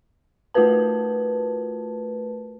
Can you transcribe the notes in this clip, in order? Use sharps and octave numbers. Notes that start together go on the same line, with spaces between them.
A3 F4 F#4 A#4 B4 A5